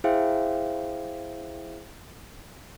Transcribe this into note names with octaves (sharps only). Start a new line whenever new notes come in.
E4 G#4 C5 E5 F5 G5